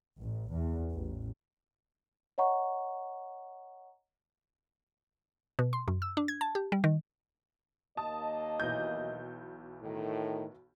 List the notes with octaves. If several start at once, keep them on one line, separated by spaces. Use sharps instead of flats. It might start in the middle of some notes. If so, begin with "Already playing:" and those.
A1
E2
A1
C#5 D#5 F#5 A#5 C#6
B2
C6
F#2
E6
D4
G#6
A5
G4
G3
D#3
D#2 A#3 D#5 A5 D#6
B1 E3 G6
A2 D#3